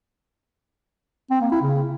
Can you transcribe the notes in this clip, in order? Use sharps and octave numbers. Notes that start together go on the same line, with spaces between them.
C4
A#3
E4
C#3